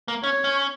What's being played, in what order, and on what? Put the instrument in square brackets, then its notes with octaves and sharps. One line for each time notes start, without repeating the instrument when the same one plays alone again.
[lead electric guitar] A#3
[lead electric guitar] C#4 [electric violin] C#5
[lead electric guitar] C#4